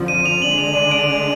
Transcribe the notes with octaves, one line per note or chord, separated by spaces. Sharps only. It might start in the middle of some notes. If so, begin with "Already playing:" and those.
Already playing: F2 D3 F3
D#7
F7
D3 G#3 D4 F#7
F7
D#7
D7